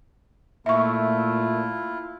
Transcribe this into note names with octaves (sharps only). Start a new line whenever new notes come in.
A#2 A3 E4 F4 E5 C#6